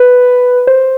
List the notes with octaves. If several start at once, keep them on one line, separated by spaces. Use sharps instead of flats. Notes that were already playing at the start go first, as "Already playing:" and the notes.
Already playing: B4
C5